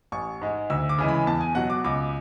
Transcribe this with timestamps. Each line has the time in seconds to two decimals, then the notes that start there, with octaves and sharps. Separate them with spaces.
0.12 A1 C#6
0.41 G#2 G#3
0.70 D2 E6
0.89 D6
0.98 C#3 E3 G#3
1.08 B5
1.27 E2 A5
1.41 G#5
1.55 B2 F#3 F#5
1.70 D6
1.84 C#2 D6